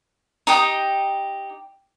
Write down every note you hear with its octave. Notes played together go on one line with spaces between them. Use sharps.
D#4 G4 G5 D#6